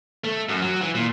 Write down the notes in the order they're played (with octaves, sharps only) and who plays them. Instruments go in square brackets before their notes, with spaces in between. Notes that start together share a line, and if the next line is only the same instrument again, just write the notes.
[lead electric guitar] A3
F#2
F#3
E3
A#2